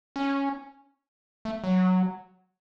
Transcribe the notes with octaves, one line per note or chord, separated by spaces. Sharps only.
C#4
A3
F#3